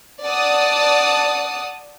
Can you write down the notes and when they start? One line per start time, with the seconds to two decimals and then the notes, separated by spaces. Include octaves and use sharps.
0.24 D5 F#5 A5 D#6